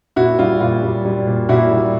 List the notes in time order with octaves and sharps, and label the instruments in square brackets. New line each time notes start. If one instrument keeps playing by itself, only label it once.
[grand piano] A#2 E4 F#4
G3 F4
A#2 F4
G3
G3
A#2
A#2 E4 F#4
G3